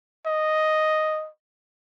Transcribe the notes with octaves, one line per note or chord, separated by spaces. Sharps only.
D#5